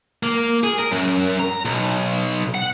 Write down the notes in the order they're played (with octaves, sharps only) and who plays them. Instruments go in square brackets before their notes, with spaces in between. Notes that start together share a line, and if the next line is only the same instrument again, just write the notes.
[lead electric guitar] A#3
G#4
A#4
F#2
A#5
B1
F#5